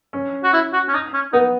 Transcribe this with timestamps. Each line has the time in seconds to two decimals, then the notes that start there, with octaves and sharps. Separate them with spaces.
0.13 C#4
0.43 F#4
0.53 E4
0.73 F#4
0.88 C#4
0.94 D#4
1.13 C#4
1.33 B3 D#4